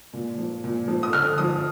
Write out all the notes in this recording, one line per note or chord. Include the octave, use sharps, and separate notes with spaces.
A#2
F3
A#2
F3
D#6
D3 F6
F3 D#6